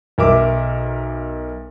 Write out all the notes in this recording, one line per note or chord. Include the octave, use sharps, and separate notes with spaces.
B1 A#4 E5 D6